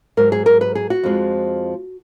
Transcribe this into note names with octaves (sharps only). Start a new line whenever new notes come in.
G#2 F#3 A#4
G#4
A#4
B4
G#4
F#4
F2 F3 G#3